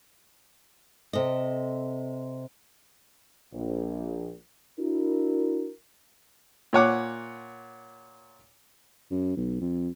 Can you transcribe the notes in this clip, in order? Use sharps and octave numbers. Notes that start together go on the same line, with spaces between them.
C3 A4 D#5
A#1
D4 E4 F#4 A#4
A#2 C#5 F#5 D6
F#2
B1
F2